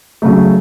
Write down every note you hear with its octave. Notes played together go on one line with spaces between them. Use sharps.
C#3 F#3 A3